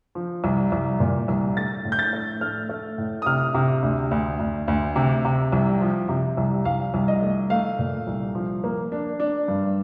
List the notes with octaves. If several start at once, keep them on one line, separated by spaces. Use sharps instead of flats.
F3
C2
C2
A#2
C2
A3 A6
A2
G6
A6
A3
A3 F6
A3
A2
D#6
C3 F6
C3
D2
D2
D2
D2
C3
C3
C2
F3
C3
C2
C2 F5
C2
D#5
A3
A3 F5
A#2
C2
F3
A#3
D4
D4
G2